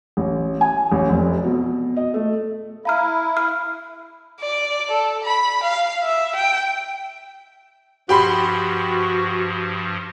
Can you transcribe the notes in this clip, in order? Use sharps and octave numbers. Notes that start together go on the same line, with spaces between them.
A1
G#5
A1
F1
B2
D#5
A3
E4 F5 A#5 F6
F6
D5
A4
B5
F5
E5
G5
G2 F3 F#4 G4 B5 C6